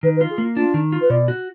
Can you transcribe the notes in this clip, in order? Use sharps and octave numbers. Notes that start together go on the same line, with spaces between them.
D#3 B4
B4
F4
G#4
A#3
D4 F4
D#3
F4
B4
B2 D5
F#4